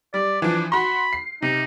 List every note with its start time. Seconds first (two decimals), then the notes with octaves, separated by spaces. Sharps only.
0.14 G3 D5
0.42 E3 F3 D4
0.72 F#4 B5 C6
1.13 C7
1.42 C3 D#4